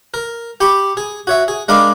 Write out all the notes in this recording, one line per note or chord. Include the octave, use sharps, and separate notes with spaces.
A#4
G4 B5 C#6
G#4
F#4 C#5 E5
G#4
G#3 D4 A#4 F5 B5 D6